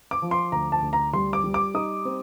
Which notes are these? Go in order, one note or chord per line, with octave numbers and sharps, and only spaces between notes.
D6
F3
C6
D2 A#5
A5
D2
A#5
G3 C6
D6
G3
D6
D#4 D#6
C4